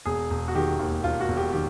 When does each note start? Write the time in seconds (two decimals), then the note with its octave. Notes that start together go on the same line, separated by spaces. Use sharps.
0.05 E1 G#4
0.30 E1
0.48 F#4
0.55 D#3 G4
0.79 D#2
1.04 E1 F4
1.20 F#4
1.28 E1
1.37 G4
1.53 D#3 G4